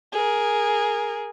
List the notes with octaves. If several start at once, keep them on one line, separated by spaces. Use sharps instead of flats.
G#4 A#4